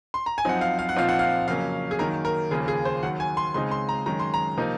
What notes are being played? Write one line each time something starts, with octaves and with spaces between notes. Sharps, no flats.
C6
A#5
G#5
F#2 F3 C4 D#4 F#5
F5
F5
F#5
A#2 F3 C4 D#4 F5
F#5
F5
F2 C#3 F#3 A#3 C#4 F5
G#4
F#2 D#3 F#3 A#3 D#4 A#4
A#4
D#2 C#3 F3 A#3 G#4
G#4
C5
D#2 D#3 F#3 F#5
G#5
C6
C#2 C#3 G#3 C4 D#4 C6
C6
A#5
F#2 D#3 G#3 C#4 A#5
C6
A#5
C3 F3 A#3 D#4